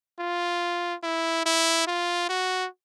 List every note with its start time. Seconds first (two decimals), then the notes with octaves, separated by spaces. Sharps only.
0.19 F4
1.03 E4
1.46 E4
1.87 F4
2.29 F#4